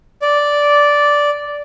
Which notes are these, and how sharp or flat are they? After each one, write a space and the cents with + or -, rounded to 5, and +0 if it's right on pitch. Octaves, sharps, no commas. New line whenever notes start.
D5 -5